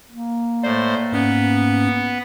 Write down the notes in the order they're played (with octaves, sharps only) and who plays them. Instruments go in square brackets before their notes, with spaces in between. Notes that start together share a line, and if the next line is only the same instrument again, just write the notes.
[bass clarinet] A#3
[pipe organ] A2 C5 [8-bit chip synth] D5
[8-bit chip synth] G#2 C#4 [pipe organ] B3